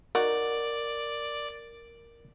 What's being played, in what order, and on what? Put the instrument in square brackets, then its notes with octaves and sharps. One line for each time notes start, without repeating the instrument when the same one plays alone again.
[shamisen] D#4 F#4 [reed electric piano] A#4 [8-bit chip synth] D5